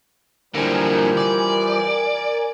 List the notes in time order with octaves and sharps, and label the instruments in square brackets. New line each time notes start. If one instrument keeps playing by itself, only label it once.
[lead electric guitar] D3 A#3 [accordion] E3 F3 G3 [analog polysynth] A#4 G#5
[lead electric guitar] D5